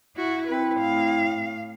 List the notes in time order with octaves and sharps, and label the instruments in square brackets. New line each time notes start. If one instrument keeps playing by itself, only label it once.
[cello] E4 F#4
[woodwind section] C4 E4 [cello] B4
[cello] A2 F5